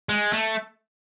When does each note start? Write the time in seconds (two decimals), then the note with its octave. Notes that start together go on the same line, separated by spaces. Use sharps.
0.09 G#3
0.33 A3